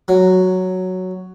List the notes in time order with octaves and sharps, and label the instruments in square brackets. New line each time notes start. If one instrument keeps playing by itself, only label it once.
[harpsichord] F#3